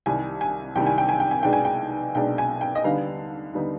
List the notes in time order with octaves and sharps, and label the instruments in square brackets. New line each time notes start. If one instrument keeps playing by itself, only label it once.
[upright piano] C2 C3 D#3 G3 G#5
G#5
C2 C3 D#3 G3 G5
G#5
G5
G#5
G5
G#5
B1 B2 G#3 D4 G5
G#5
G5
B1 B2 G#3 D4 G5
G#5
G5
D#5
D#2 D3 G3 B3 D#4 F5
D#2 D3 G3 B3 D#4